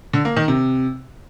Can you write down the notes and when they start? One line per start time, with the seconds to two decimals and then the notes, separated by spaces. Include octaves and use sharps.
0.13 D3
0.25 A#3
0.37 D#3
0.48 C3